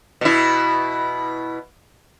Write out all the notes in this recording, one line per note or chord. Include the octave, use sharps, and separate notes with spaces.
B2 E4